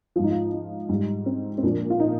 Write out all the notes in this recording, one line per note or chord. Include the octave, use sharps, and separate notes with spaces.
G#2 F3 D#4 F4
F4
D#4
G#2 G3
C4
C4
A#2 F3 D4
F4
D#4